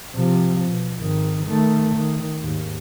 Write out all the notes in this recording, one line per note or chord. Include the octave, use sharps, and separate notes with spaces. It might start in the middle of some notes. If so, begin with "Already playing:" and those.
C3 F3
B2
G#1 D#3
D#3 A3
D#3
D#2 G#2